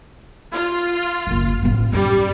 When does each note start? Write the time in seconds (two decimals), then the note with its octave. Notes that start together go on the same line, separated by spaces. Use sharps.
0.53 F4
1.27 F#1 D#2
1.62 A1 B3
1.93 F#2 G3